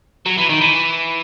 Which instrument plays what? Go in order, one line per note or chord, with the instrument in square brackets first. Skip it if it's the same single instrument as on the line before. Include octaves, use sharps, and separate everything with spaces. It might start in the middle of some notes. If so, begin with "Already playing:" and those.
[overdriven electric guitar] F#3
E3
D#3
E3